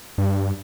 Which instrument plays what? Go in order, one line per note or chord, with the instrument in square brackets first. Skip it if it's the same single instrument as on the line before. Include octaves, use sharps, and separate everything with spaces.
[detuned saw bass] G2